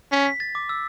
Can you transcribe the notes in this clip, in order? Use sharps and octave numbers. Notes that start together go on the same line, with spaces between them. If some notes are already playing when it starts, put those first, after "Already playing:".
C#4 B6
B6
A6
D6
E6